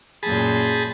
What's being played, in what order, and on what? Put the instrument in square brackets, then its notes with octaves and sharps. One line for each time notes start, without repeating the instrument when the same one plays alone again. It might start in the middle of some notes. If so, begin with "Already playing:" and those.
[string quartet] F#2 A#2 G6 [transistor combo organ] G#4 A5 B5